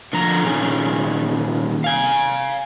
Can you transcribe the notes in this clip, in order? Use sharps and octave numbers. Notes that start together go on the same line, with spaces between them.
D3 F3 A#5
A#2 D#3 C#4 G#4
F5 G#5